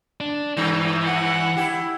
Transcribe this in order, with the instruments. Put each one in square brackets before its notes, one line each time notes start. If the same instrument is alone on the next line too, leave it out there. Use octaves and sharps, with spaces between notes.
[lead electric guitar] D4
[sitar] G2 [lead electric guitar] E3
[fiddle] F#5
[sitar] E4 G4